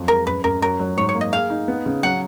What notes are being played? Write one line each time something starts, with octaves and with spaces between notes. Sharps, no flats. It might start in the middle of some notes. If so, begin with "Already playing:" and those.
Already playing: F2 F#3
G#3 A#4
F#2 B4
F#2 A#4
F#3 A#4
F#3
G#2 C#5
C#5
A#3
D#5
G#4 F5
D#4
B3
C#3
F#3 F#5